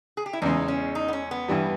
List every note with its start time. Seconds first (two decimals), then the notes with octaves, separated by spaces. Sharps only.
0.17 G#4
0.26 G4
0.33 E4
0.42 E2 C#3 G#3 D#4
0.68 C#4
0.95 D#4
1.08 B3
1.13 C#4
1.31 B3
1.48 G2 E3 G3